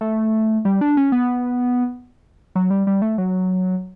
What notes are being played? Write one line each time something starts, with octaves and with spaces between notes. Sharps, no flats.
A3
G3
D4
C#4
B3
F#3
G3
G3
A3
F#3